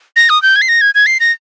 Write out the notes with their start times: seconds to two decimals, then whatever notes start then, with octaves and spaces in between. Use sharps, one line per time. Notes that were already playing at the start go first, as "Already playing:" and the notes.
0.16 A#6
0.30 D#6
0.42 G6
0.56 G#6
0.62 C7
0.68 A#6
0.81 G#6
0.95 G#6
1.06 C7
1.20 A#6